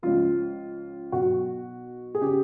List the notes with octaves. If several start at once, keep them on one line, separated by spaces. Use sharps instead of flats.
C#2 C#3 F3 F4
B1 B2 F#4
G#4
C#3 G4